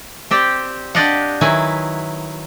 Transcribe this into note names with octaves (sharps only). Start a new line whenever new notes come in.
C4 G4 C5 D5
D4 G4 D5 D#5 F5 F#5
D#3 F#3 E4 B4 G#5